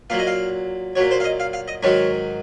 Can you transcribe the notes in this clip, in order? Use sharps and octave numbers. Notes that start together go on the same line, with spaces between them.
A#2 F#3 F5
D#5
F5
A#2 F#3 C#5
C5
F5
D#5
F5
F5
D#5
G#2 D#3 F#3 C#5